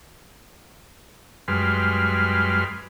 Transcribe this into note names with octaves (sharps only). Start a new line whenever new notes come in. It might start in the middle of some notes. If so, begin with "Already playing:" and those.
F#2 G3 G#3 B4 C6 F6